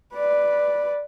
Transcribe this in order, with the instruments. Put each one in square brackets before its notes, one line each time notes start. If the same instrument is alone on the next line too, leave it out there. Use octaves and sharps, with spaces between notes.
[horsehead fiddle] B4 D5